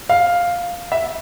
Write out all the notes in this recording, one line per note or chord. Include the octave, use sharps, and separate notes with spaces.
F5
E5